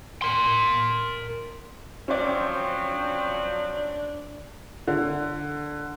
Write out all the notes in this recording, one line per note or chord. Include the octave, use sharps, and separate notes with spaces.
A#4 C6
F3 F#3 C4 C#4 C5 D5
D4
D3